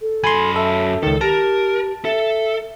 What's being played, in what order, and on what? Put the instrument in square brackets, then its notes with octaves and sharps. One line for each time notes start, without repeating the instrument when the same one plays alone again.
[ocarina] A4
[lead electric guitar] F#2 B5 [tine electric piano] G#5 C6
[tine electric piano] A4 [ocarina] E5
[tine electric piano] C#2 D#3 [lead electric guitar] A4
[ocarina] G4 [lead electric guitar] A#4 [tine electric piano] A5
[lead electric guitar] A4 [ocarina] E5